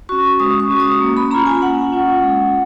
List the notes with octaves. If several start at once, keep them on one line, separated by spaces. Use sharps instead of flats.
C#4 F#4 C#6
G#3 D#6
C#6
C#4 F#4
D#6
A#3
B5
C#4 F4 A#5
G#5
A#3 F#5
C#4 F4
G#3